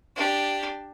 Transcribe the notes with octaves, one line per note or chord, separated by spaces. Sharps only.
D4 G4